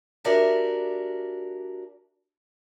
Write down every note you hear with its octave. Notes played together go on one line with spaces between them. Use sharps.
D4 F#4 G4 A#4 D5 E5